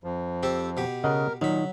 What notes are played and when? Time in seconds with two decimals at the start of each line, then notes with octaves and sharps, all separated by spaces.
0.04 F2 F3
0.43 C4 G4 A4
0.77 B2 G4
1.04 C#3 A#4 D#5 F#5
1.41 A#2 D#3 F#3 B5